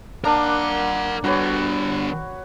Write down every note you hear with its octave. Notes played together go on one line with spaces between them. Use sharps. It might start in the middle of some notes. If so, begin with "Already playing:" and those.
A#3 D4 A#4 F#5
D3 G3 F#4 B4 C#5